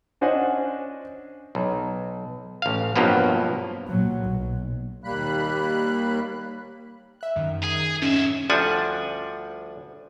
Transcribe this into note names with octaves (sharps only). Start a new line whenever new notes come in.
C#4 D4 C5 D#5 F#5 G#5
B1
A1 F5
G2 B2 F3 F#3 A#3 B3
A#2 F#3
B1
D#2 G3 A#3 B5 F#6
E5 F#6
F#2 D#3 G3
G#4
G#2 C#4 E5
D2 F3 G3 D4 F#5 G#5